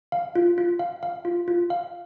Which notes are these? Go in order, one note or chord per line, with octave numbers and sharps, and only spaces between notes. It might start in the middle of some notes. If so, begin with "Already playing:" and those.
F5
F4
F4
F5
F5
F4
F4
F5